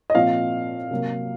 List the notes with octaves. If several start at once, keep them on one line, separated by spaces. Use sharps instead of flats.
D#5
A#2 F3 C4 F5
C3 F#3 A#3